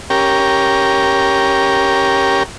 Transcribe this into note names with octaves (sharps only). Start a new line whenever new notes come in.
C#4 G4 A#4